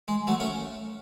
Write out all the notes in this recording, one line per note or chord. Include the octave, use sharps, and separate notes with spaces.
G#3
F#3 A3
A3 C#4